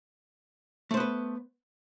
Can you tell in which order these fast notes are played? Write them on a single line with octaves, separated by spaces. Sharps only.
A3 C5 B3 B4